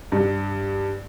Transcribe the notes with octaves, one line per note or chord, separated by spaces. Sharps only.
G2